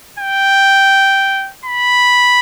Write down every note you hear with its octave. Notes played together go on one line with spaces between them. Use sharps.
G5
B5